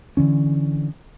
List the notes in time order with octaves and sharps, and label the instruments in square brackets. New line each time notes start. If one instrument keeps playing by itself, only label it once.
[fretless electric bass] D3 E3 C#4